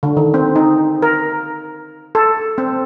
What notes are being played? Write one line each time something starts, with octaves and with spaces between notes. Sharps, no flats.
D3
D#3
C4
D#4
A#4
A4
C4